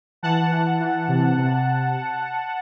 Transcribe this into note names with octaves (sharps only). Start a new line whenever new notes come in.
E3 F#5 A5
E3
E3
C3
C3